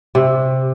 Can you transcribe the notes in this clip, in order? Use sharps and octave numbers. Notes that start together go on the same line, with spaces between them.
C3